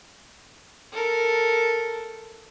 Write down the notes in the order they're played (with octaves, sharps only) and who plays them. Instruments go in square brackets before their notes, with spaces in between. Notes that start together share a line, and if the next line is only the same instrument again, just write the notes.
[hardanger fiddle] A4 A#4